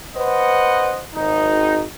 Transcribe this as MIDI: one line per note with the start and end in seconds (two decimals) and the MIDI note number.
0.16 1.00 71
0.16 1.00 72
0.16 1.00 75
0.16 1.00 78
1.15 1.82 32
1.15 1.82 63